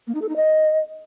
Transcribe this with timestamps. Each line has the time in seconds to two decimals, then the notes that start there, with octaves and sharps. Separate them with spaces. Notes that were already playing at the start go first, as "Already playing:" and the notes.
0.07 A#3
0.15 D#4
0.22 A4
0.29 D#4
0.36 D#5